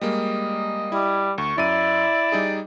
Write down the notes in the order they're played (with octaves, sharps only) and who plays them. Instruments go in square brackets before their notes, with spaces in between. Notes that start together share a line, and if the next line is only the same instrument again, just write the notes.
[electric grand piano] G3 G#3 A#3 [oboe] D#5
[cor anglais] G3 [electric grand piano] E4
[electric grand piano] D2 [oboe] C#6
[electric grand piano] F#2 D#7 [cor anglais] E4 [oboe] D5
[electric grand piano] G3 D#4 G#4